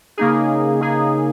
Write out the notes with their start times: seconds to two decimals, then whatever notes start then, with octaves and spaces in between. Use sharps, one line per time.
0.17 C#3 A#3 D#4 G#4
0.81 C#3 A#3 D#4 G#4